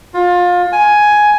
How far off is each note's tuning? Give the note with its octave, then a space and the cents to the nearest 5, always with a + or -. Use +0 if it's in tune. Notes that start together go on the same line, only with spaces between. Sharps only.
F4 +25
G#5 +10